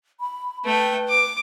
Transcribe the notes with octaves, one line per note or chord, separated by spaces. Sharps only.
B5
A3 B4 G5
D6